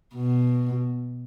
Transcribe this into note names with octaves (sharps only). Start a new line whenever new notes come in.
B2